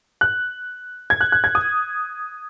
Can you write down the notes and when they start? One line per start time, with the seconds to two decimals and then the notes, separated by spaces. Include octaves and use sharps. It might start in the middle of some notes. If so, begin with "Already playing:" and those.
0.21 F#6
1.10 G#6
1.21 F#6
1.32 F#6
1.44 G#6
1.55 D#6